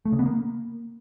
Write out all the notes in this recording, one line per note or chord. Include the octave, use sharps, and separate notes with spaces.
A3
C#3
B3
A#3